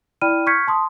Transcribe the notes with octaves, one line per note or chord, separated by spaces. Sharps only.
E4 D5 G5 B5 F6 D#7
C#6 F6 G6 G#6 B6 C#7
A5 C6 D#6